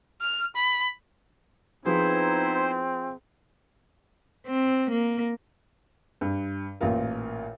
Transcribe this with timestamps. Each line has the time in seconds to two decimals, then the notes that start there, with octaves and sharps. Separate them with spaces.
0.22 F6
0.56 B5
1.85 F3 B3 C4 D#4 E4 G#4 C5
4.47 C4
4.91 A#3
6.21 G2
6.81 A1 A#2 F4 A#4